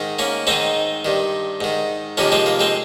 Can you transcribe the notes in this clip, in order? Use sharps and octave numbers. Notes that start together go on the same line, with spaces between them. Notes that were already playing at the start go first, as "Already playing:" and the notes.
Already playing: G#2 D#3
A#3 C#4
G#2 D#3 C4 D#4
G2 D#3
G#2 D#3
F2 C3 D#3 A#3 C#4
G#3 C4
A#3
G#3 C4